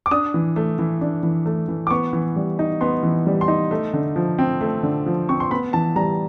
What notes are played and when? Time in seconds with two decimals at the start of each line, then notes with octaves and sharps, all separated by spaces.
0.06 D6
0.11 D4 D#6
0.34 E3
0.56 A3
0.79 E3
1.01 D4
1.23 E3
1.46 A3
1.68 E3
1.87 D6
1.91 B3 C#6
2.13 E3
2.36 G3
2.59 D#4
2.81 B3 C6
3.03 E3
3.27 G3
3.41 C6
3.48 D#4
3.71 A3
3.93 D3
4.16 F3
4.38 C4
4.61 A3
4.83 D3
5.06 F3
5.29 C4 C#6
5.40 C6
5.51 B3 B5
5.73 E3 A5
5.96 G3 A#5